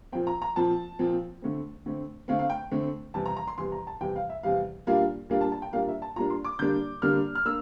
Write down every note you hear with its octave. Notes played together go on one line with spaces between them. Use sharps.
A#2 F3 C4 G5
A#5
A#5
A#2 F3 C4 A5
A#2 F3 C4
D3 A3 C4
D3 A3 C4
D3 A3 C4 F5
F5
G5
D3 A3 C4
E2 C3 G3 A5
A#5
A#5
C6
E2 C3 G3 C6
A#5
A5
E2 C3 G3 G5
F5
E5
E2 C3 G3 F5
A#2 G3 A#3 D4 F5
A#2 G3 A#3 D4 F5
A5
A5
G5
A#2 G3 A#3 D4 F5
E5
A5
A#2 G3 A#3 D4 A#5
C6
D6
D3 G3 A#3 D4 G6
D3 G3 A#3 D4 F6
F6
A#3 D4 E6